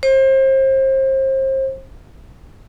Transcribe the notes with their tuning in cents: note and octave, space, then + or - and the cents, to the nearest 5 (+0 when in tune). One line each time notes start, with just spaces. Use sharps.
C5 +30